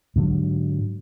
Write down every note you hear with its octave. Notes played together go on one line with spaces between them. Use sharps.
G#2 D3 F#3